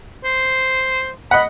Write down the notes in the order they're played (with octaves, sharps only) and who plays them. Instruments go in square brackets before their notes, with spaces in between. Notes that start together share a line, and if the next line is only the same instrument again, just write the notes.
[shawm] C5
[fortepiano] D#5 F#5 [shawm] B5